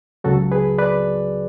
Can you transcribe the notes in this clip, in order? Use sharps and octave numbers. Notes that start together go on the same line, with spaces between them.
C#2 C#3 F#3 F#4 A4
G#4 B4
B4 D5